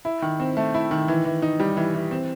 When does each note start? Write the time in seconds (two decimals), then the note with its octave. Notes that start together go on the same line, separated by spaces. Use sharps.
0.05 E4
0.22 D#3
0.40 C4
0.57 A3
0.74 E4
0.91 D#3
1.08 E3
1.25 E3
1.42 D#4
1.60 G3
1.77 E3
1.95 E3
2.11 C4